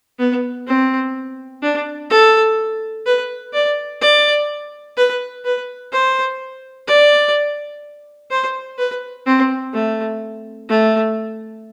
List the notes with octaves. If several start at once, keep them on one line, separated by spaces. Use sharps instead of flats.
B3
C4
D4
A4
B4
D5
D5
B4
B4
C5
D5
C5
B4
C4
A3
A3